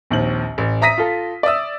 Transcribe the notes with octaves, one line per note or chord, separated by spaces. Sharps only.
A#1 D#2 C4 F#7
A1
E5 A#5 D#6 A#6 B6 D#7
F4 A4
D5 E5 D#6 E6